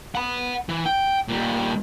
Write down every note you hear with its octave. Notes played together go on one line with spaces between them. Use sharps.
F#5 B5
E3
G5
A#2 G3